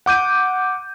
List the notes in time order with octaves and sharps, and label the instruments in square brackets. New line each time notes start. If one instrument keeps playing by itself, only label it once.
[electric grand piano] F#5 D6 G6 D#7